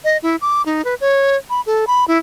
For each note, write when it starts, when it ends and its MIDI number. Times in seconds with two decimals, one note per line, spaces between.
0.04 0.17 75
0.23 0.36 64
0.41 0.62 86
0.66 0.82 63
0.85 0.95 71
1.01 1.37 73
1.50 1.61 83
1.66 1.85 69
1.87 2.05 83
2.08 2.18 64